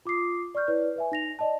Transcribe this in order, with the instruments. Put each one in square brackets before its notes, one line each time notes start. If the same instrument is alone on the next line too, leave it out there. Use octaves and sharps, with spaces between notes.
[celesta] F4 D6 D#6 C7
D5 C#6 F6 G6
E4 B4 C#5 D5
B4 E5 G#5
D#4 A#6 F7
D5 D#5 A5